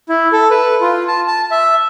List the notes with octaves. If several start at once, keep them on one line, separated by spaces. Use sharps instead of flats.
E4
A4
B4
F4
A5
A5
E5